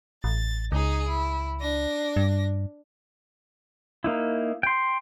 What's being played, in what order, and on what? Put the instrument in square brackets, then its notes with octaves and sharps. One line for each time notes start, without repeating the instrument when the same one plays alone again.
[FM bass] A1 [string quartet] A6
[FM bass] C#2 [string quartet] D#4 G#4
[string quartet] E4
D4 A#6
[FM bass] G2
[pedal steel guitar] A#3 D#4 E4
G5 C6